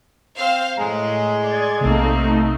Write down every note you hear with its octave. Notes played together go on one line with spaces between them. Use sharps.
C4 C5 F5
A2 G#3 A#5
D5 C6 G#6
B1 C3 A3 A#3 C4 D#4